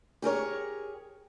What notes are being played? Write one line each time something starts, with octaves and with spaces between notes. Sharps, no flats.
G4 G#4 A#4 C#5